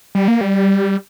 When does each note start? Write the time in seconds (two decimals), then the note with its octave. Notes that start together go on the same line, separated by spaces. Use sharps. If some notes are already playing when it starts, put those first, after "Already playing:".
0.15 G3
0.28 A#3
0.41 G3